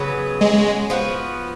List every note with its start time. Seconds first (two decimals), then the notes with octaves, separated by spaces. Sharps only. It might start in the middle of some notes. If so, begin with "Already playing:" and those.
Already playing: C#3 F#3 B3
0.41 G#3
0.90 F3 B3 F#4